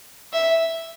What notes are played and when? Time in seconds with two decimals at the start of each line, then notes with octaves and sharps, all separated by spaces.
0.33 E5